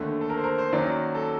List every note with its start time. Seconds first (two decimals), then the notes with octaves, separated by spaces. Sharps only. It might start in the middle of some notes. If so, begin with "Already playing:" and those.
Already playing: D#2 D3 A3
0.21 A4
0.30 A#4
0.37 C5
0.44 A#4
0.58 C5
0.72 F#2 D#3 F#3 A#3 D5
1.15 A4